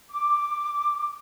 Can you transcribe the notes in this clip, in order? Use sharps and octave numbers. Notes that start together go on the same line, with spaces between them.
D6